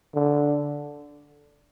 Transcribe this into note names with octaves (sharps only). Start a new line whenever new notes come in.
D3